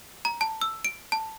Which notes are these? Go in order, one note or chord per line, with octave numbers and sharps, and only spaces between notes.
A#5
A5
E6
D7
A5